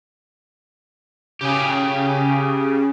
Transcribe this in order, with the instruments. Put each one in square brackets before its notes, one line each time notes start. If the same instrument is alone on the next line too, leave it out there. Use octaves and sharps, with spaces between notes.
[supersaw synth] C#3 [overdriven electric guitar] G4 G#4